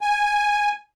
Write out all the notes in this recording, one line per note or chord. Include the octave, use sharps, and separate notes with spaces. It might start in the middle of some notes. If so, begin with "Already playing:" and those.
G#5